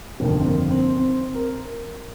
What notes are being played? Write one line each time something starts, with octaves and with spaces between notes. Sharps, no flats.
G1 F2 D#3 A#3
C4
A#3
C4
C4
A#4